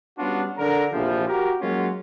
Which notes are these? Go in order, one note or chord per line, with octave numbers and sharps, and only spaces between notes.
G3 B3 C#4 D4 F4 F#4
D3 A#4
A#1 E2 C3 F3
F#4 G4 A#4
F#3 G#3 A#3 C#4 F4 F#4